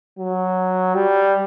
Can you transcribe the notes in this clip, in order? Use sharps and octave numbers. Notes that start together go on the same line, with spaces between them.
F#3
G3